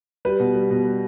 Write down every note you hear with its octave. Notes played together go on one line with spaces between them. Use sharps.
G3 B4
B2
G3
B2
G3